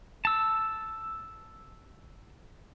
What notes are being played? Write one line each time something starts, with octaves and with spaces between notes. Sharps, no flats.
A5 E6